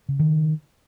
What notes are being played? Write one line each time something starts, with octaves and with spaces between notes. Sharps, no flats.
C#3
D#3